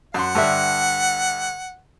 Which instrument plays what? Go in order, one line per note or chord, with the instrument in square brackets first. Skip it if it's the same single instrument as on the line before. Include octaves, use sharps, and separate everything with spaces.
[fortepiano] F#2 C6 [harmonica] F#5
[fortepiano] G2 D3 E5